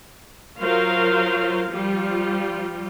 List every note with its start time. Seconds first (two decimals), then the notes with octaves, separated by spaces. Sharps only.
0.58 F#3 F4 A#4 C5 F5
1.67 F3 G3 F4